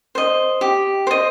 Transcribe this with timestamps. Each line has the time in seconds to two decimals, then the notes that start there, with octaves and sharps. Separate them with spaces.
0.15 C5 D#5
0.61 G4
1.07 C5 D#5